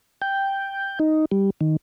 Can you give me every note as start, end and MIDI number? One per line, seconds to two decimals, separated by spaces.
0.22 0.99 79
1.00 1.25 63
1.31 1.50 55
1.61 1.77 51